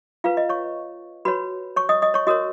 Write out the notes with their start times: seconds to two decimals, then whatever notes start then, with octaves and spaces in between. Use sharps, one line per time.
0.24 F4 B4 F5
0.37 D#5
0.49 C#5 C#6
1.25 F#4 B4 C#5 B5
1.76 C#5 C#6
1.89 D#5 D#6
2.02 D#5 D#6
2.14 C#5 C#6
2.27 F#4 A#4 C#5 D#5 D#6